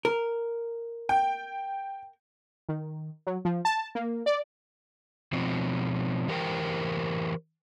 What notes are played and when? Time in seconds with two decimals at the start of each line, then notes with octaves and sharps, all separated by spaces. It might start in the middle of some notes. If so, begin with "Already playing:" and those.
0.05 A#4
1.09 G5
2.69 D#3
3.27 F#3
3.45 F3
3.65 A5
3.95 A#3
4.26 D5
5.33 B2 F3 C4
6.28 E3 G4 A#4 C5 G5